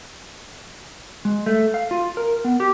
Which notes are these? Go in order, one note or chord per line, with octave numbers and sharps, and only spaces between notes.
G#3
A3
F5
F4
A#4
B3
G4